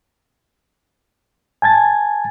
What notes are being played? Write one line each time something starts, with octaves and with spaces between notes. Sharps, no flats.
G#5 A5 G#6 A6